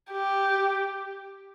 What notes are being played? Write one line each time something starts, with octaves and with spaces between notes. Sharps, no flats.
G4